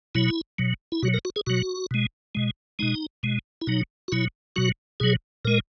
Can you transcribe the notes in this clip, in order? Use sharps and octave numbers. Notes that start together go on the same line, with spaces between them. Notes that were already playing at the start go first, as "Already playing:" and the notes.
B2 F#3 E4
B2 F#3
E4
B2 F#3 F#4
A#4
F#4
G#4
B2 F#3 F#4
B2 G#3
B2 G#3
B2 G#3 D#4
B2 G#3
E4
B2 F#3 D#4
F#4
B2 F#3 E4
B2 F#3 F#4
B2 F#3 G#4
A#2 G#3 A#4